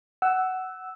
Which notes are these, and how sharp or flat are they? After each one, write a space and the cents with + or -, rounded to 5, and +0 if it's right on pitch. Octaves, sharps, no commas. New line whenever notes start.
F#5 +15 E6 +0